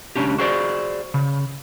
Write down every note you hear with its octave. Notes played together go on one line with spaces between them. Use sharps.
C#2 C3 C#4 D4 G4
F#4 G#4 C5 D5
C#3